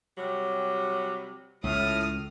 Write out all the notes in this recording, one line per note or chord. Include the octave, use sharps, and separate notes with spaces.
C3 F#3 G3
C#2 A2 D#6 F6